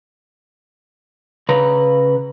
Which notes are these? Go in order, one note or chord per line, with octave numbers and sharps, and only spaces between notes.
C#3 B4 A#5